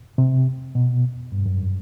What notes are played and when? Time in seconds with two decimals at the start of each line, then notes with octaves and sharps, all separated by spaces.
0.18 C3
0.75 B2
1.32 G2
1.46 F#2